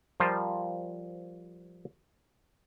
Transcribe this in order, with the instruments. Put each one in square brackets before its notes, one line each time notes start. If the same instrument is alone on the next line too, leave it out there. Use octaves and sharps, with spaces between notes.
[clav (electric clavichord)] F3 G3 F4 A#4 C5